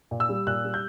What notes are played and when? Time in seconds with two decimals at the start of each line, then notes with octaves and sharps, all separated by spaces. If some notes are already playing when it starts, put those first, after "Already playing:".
0.11 A#2
0.20 E6
0.29 G3
0.47 A#2 F#6
0.64 G3
0.74 G6